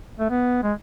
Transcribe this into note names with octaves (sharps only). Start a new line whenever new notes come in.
A3
B3
G#3